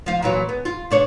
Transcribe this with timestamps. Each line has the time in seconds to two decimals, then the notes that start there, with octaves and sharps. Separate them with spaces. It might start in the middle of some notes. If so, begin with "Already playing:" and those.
0.06 F3 F4
0.22 A#2 E3 F#3
0.49 B3
0.65 F4
0.91 B2 D4 C#5